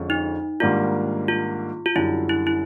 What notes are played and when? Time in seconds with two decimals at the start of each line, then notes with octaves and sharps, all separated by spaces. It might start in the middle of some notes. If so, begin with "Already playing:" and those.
Already playing: F2 D3 F3 G#3 C#4
0.10 D#4
0.60 G#2 D#3 G3 A#3 D4 F4
1.28 F4
1.86 F4
1.95 F#2 D3 G3 E4
2.29 E4
2.47 E4